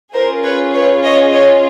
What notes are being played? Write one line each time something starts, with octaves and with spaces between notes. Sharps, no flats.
C#4 F4 G#4 A#4 C5
B4 C#5
B4 C#5
C#5 D#5
C#5 D#5